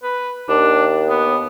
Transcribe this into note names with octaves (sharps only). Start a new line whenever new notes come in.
B4
D#2 D4
B3